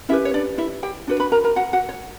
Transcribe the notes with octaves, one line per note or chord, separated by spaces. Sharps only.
C#4 E4 G4 B4 E5
C#5
D4 D5
E4 E5
G4 G5
D4 F#4 B4
B4 B5
A#4 A#5
A#4 A#5
F#4 F#5
F#4 F#5
C#5